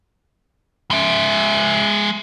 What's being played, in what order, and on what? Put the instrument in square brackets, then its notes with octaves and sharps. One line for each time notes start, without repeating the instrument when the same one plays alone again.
[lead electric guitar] G#3 E5